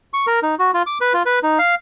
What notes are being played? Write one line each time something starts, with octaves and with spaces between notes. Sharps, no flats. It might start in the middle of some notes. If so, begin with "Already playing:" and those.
C#6
A#4
D#4
F#4
F4
D6
B4
F4
B4
D#4
F5